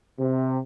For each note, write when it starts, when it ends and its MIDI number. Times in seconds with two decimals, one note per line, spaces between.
0.19 0.58 48